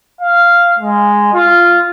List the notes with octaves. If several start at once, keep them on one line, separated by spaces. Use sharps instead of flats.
F5
G#3
F4